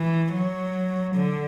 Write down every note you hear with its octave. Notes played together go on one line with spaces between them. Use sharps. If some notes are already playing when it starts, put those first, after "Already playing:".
Already playing: E3
F#3
D3